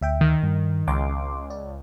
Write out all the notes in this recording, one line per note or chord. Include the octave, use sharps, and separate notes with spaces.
D2 E5 G5
D#3
G2
C#2 C6 D6
D5